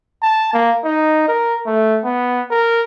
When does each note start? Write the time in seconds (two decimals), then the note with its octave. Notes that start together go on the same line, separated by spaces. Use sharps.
0.22 A5
0.53 A#3
0.84 D#4
1.28 A#4
1.67 A3
2.04 B3
2.51 A#4